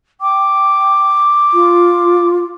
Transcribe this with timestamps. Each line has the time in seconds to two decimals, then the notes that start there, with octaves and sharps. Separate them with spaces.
0.21 G5 D6
1.54 F4